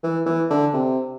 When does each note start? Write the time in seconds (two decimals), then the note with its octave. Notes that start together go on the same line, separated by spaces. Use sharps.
0.03 E3
0.26 E3
0.50 D3
0.74 C3